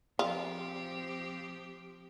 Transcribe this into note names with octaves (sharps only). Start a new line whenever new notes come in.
F3 C4 F4 G4